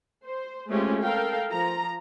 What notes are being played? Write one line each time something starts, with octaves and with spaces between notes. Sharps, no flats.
C5
G#3 A3 C4 C#4 F4 G4
A4 A#4 F5 G5
F3 A#5